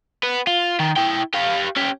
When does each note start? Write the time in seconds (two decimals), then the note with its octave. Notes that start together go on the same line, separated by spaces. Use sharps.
0.23 B3
0.47 F4
0.79 D#3
0.96 E4 G5
1.34 G4 F5
1.77 C#4 G4